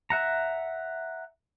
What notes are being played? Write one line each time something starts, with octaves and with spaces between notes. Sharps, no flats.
E5 F#5 A#5